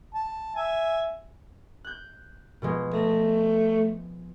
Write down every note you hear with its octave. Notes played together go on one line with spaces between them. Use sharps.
A5
E5 G#5
F#6 G6
B2 F3 G#3
A3 A#6